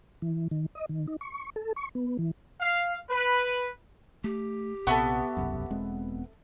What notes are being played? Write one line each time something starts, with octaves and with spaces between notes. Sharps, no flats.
E3
D#3
D#5
D#3
D#4
C#6
A4
C#6
B3
E3
F5
B4
A3 G4
A#1 C3 B3 A4 E5 C#6
E1 C2 F#2
E1 G#3 C4